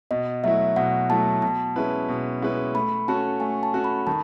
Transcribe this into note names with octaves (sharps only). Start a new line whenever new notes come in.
B2 D#5
F#3 A3 E4 E5
B2 F#5
F#3 A3 E4 A5
B2 A5
G#3 C#4 E4 B4
B2
G#3 C#4 E4 B4
A3 B5
C#4 F#4 A4 A5
A3 G#5
A5
C#4 F#4 A4
B5
D#3 A5